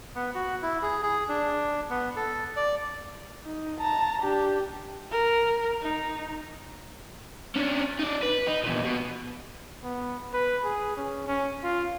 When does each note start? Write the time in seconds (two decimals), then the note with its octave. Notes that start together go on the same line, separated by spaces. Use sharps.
0.15 B3
0.35 F#4
0.62 E4
0.83 G#4
1.03 G#4
1.29 D4
1.90 B3
2.16 A4
2.56 D5
3.44 D#4
3.80 A5 A#5
4.22 D4 G4
5.11 A#4
5.82 D#4
7.56 C#4 D4
7.99 D#4 D5
8.23 B4
8.48 D#4
8.64 E2 A#2
8.85 B2
9.84 B3
10.33 B4
10.64 G#4
10.97 C#4
11.27 C#4
11.63 F4